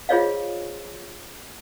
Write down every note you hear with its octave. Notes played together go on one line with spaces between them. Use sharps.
F4 G#4 C5 C#5 D#5 F5